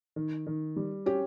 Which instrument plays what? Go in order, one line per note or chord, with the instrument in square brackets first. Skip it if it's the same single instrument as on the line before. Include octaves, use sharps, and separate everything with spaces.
[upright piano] D#3
D#3
G3
[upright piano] C#4 [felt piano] G4